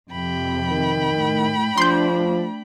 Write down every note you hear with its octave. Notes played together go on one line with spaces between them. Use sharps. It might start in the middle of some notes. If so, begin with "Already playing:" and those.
F2 C3 G5 B5
D#3
A2
F3 A3 D4 C6 G6